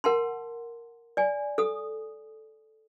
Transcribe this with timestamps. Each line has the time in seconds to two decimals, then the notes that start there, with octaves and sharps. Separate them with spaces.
0.04 A#4 F#5 A5 C6
1.17 D5 G#5
1.58 A4 D#6